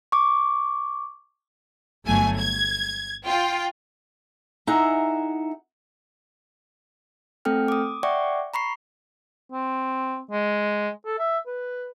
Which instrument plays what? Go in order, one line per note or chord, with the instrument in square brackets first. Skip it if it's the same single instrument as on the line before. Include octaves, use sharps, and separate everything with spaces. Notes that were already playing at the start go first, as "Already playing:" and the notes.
[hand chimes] C#6 D6
[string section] G1 F#3 A3 G#5
G#6
F4 G5
[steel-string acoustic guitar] D#4 E4 G#4 E5 F#5 A#5
[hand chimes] A3 C4 A4 G5 F6
D6 D#6
D5 E5 F#5 G5 C#6 D6
A#5 B5 C#6 C7
[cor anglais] C4
G#3
A4
E5
B4